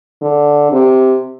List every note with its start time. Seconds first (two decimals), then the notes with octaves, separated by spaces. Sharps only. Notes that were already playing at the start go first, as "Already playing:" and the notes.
0.22 D3
0.72 C3